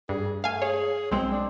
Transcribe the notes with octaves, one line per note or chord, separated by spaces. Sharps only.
G2 G#4
A3 F5 G#5
G#4 C#5
B1 G#3 C4
D4